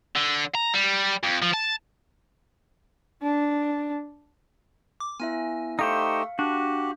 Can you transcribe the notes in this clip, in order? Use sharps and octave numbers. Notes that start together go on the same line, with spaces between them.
D3
A#5
G3
F2
F3
A5
D4
D6
B3 E4 E5 G#5
A3 D#4 G4 C5 F5 C#7
D4 F#4 G4